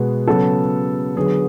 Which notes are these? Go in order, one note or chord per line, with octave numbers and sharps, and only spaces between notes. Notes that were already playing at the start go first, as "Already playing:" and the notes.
Already playing: B2 G#3 B3
C#3 F#3 B3 A4
D3 F#3 B3 G#4